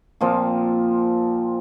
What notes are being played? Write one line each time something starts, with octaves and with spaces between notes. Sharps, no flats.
A#2 F3 C4